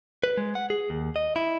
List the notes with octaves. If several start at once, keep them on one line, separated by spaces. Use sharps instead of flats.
B4
G#3
F#5
G#4
D#2
D#5
E4